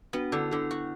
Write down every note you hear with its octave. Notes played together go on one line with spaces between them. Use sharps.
B3 D4 F#4
D3 E4 A4
D3 E4 A4
F#4